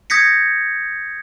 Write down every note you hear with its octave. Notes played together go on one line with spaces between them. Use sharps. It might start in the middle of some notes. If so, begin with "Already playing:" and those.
D#6 G6 G#6 A#6 B6 C#7